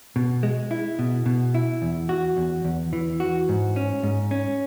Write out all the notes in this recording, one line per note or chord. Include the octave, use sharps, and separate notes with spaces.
B2
G#3
E4
B2
B2
E4
E2
F#4
E2
E2
E3
F#4
G#2
C#4
G#2
C#4